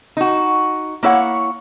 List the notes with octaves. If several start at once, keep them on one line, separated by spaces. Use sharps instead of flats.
D#4 F#4
A#3 E4 C#5 F#5